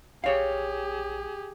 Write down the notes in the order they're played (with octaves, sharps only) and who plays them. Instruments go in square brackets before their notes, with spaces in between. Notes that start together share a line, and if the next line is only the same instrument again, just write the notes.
[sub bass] A#1 [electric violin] G4 G#4 [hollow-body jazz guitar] C#5 F5